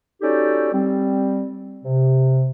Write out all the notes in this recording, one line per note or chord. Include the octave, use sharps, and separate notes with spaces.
C#4 D#4 F#4 G4 A4 D5
G3 C4
C3